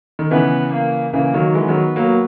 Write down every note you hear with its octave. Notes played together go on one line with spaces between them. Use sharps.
D#3
C#3 E3 B3
A#3
C#3 E3 A#3
D#3 F#3
E3 G#3 B3
D#3 F#3
F#3 A#3